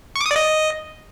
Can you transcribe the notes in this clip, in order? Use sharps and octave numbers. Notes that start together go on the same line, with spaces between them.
C#6
D6
D#6
D5
D#5